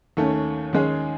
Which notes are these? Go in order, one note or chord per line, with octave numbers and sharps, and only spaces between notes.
D#2 D#3 A3 C#4
D#2 D#3 G#3 C#4 G#4